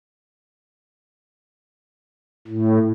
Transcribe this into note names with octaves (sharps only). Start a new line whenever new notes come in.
A2